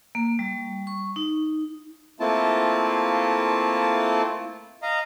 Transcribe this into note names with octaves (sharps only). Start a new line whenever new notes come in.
A#3
G3
C#6
D#4
A3 A#3 C4 E4 F4 A5
D#5 F5 A#5